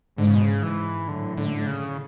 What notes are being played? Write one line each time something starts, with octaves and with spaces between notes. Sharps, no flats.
G#2 D3
C#3
B2
C#3
G#2 E3
F#2 A2 D3
D3
C#3